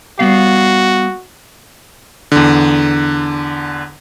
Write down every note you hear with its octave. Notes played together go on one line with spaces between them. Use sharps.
G3 B3 F#4 F5
E2 D3